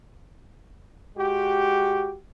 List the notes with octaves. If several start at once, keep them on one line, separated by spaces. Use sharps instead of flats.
G#3 F#4 G4